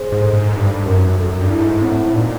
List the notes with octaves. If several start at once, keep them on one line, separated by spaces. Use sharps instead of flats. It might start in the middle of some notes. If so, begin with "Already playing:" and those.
Already playing: G#4 C5
G#2
A4
G#2
G2 D#4
F#2 A#4
F#2 A4
G2
E4
G#2
A2 C4
A2
A#2 D#4